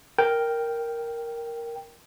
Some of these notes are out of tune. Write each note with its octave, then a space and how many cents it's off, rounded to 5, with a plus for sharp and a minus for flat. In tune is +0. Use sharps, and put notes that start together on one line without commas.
A#4 +0 G5 +0